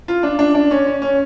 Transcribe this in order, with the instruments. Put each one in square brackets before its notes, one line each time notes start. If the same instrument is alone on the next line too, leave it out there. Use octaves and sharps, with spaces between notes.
[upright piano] F4
D4
D4
D4
C#4
C#4
C#4